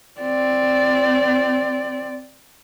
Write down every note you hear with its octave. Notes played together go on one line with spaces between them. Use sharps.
C4 D5